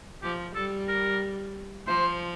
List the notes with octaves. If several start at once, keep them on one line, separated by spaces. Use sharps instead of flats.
F3 G4
G3 A4
A#4
F3 C5